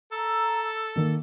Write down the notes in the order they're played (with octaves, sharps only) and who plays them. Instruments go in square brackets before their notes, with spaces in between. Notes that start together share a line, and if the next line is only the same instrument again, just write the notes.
[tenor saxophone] A4 [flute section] A#5 E6
[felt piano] D#3 A#3